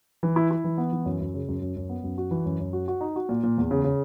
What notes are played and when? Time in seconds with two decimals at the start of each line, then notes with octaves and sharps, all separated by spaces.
0.23 E3
0.36 E4
0.51 E4
0.64 E3
0.78 B3
0.93 E3
1.06 F#2
1.20 F#2
1.34 C#3
1.48 F#2
1.61 F#2
1.76 F#2
1.89 B3
2.03 F#2
2.18 F#4
2.31 E3
2.45 F#2
2.59 F#2
2.73 F#4
2.88 F#4
3.01 D#4
3.16 F#4
3.29 A#2
3.43 A#2
3.58 E2
3.71 C#3
3.84 C#3